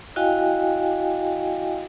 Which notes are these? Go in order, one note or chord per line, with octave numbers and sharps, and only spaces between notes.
E4 F#4 D#5 F5 G5 G#5